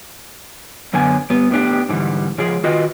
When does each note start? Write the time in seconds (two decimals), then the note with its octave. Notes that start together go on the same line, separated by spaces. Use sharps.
0.93 F#2 D3 B3 G#5
1.30 G2 B3
1.51 A2 B3 D4 G4
1.89 G#2 D3 E3 G3
2.38 C#3 F3 G#3 G#4
2.63 D#3 F4 F#4 B4 D#5